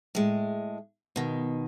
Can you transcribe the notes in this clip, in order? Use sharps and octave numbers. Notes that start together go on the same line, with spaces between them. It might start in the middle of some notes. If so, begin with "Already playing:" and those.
A2 G#3
B2 D#3